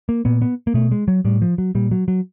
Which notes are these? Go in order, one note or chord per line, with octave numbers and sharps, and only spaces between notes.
A#3
A#2 B3
B3
A#3
B2 A3
G#3
F#3
A2 G3
F3
F#3
A#2 G3
F#3
F#3